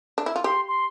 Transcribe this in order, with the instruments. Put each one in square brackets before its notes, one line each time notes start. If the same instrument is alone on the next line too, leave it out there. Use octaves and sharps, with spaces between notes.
[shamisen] D4
E4
F4
[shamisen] G4 [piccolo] C6
[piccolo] C6